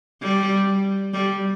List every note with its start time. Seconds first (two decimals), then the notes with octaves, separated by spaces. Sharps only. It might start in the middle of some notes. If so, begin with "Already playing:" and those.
0.22 G3
1.14 G3